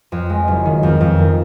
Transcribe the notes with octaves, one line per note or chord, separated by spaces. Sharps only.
F2
G#3
F#1
D#3
F2
F2
D#3